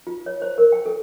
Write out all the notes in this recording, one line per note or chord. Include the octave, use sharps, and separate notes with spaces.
F4
C#5
C5
A#4
G5
A4